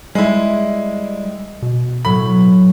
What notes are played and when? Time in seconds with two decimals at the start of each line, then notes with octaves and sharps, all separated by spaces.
0.15 G3 G#3 E4
1.62 B2
2.05 A2 F#3 B5